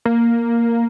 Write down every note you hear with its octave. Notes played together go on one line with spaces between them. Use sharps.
A#3